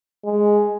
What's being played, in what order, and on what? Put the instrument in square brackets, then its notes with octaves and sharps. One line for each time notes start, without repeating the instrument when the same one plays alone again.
[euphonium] G#3